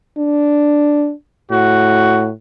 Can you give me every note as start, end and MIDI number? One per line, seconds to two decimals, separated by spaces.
0.18 1.12 62
1.51 2.31 45
1.51 2.28 66